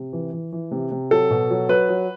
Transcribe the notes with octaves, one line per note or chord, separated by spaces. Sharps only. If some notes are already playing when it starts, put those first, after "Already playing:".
Already playing: C3
E3
E3
E3
C3
C3
F#3 A4
B2
F#3
F#3 B4
F#3